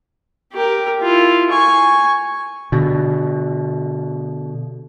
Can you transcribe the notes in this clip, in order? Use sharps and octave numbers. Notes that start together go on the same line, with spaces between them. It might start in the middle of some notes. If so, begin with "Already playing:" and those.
G4 A#4
E4 F4
G#5 C#6
B2 D3